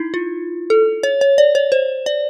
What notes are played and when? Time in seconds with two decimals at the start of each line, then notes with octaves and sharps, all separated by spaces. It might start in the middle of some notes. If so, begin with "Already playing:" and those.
Already playing: D#4 E4
0.14 F4
0.70 A4
1.03 C#5
1.21 C#5
1.38 D5
1.55 C#5
1.72 C5
2.06 D5